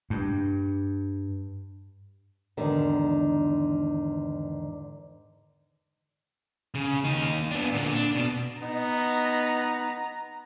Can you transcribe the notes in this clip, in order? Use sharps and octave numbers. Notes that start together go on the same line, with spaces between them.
G2
E2 G#2 D3 D#3
C#3
D#2 D#4
B3 D4
A#2 D3
D4
B2
B3 D#4 A#5